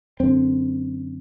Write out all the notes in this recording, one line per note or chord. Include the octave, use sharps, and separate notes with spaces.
F#2 D3 C4